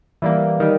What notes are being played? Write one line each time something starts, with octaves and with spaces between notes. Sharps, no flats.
E3 G3 A#3
D#3 G3